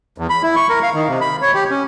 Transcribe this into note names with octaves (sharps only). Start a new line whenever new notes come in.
E2
B5
E4
C#6
A#4
F5
D#3
C3
B5
C#5
G4
C#4